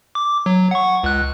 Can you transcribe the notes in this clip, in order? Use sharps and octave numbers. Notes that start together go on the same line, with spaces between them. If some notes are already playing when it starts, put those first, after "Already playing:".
D6
F#3
F#5 C#6
C#2 F#6